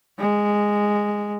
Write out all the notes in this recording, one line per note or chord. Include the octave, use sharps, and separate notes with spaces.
G#3